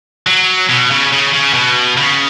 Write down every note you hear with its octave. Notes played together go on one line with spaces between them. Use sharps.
F#3
B2
C#3
C#3
C#3
B2
C#3